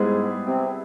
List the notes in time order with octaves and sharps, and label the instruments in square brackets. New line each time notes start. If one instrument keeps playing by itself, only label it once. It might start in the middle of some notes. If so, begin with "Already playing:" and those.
Already playing: [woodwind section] G#2 G#3 [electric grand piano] G3 B3 E4 G#4
[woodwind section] C3 C4